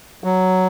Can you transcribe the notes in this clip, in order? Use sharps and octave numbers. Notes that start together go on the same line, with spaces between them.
F#3